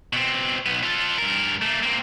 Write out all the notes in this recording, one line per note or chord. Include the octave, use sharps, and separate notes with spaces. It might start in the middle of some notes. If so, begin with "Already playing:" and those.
B2 C4
B1 B3
F4 A4
G2 A#4
A3 A#3
A#3 C4